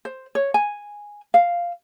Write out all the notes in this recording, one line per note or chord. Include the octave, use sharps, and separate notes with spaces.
C5
C#5
G#5
F5